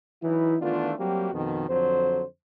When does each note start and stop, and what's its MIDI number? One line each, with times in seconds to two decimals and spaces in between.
0.23 0.56 52
0.23 0.56 54
0.23 0.56 63
0.23 0.56 64
0.61 0.92 51
0.61 0.92 52
0.61 0.92 57
0.61 0.92 59
0.61 0.92 62
0.61 0.92 65
0.99 1.33 54
0.99 1.33 55
0.99 1.33 58
0.99 1.33 60
0.99 1.33 66
0.99 1.33 67
1.33 1.66 41
1.33 1.66 47
1.33 1.66 51
1.69 2.23 41
1.69 2.23 50
1.69 2.23 54
1.69 2.23 72